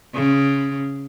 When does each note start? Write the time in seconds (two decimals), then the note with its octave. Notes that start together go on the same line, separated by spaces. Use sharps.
0.14 C#3